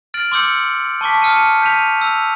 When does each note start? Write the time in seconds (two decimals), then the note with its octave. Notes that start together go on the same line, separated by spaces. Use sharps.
0.14 F6 A6 D7 F#7
0.32 C6 D6 E6 G6 C#7
1.01 A5 C#6 D6 B6
1.22 A5 D#6 F6 C#7 D#7
1.62 G6 B6 D#7 F7
2.00 E6 F7